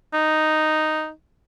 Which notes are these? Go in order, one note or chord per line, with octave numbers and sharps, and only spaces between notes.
D#4